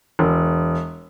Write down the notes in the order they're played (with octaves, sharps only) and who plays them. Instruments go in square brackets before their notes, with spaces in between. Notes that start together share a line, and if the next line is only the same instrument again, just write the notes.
[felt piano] E1